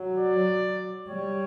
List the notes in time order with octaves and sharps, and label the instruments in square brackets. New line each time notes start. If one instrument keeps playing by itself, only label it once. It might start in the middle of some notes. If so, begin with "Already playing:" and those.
Already playing: [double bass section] F#3
[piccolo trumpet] D5
[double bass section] G3 [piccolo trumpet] C#5